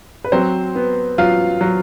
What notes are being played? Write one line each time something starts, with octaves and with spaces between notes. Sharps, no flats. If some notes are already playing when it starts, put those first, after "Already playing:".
B4
F#3 C4 C5
B3
F#3 F4 F5
F#3